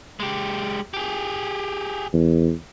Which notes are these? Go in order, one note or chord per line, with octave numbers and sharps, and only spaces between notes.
G#3 G4
G4 G#4
E2